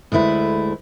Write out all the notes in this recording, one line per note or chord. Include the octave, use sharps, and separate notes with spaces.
D2 G#3 A3 E4 B4